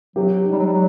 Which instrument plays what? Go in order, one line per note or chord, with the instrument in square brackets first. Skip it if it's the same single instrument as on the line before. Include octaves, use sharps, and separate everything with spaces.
[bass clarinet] F#3 [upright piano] G4
[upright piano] D#4
[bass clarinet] G3
F#3
G3
F#3